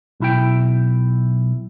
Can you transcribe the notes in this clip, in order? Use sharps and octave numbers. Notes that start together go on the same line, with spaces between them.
B1 E4 G5